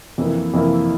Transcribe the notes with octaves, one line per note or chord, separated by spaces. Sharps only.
F2 E3 A#3 E4
F2 E3 A#3 E4